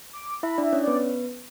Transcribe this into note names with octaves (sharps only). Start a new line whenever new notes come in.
D6
E4 E5 B5
D4 D5
E5
C#4 C#5
B3 B4 D5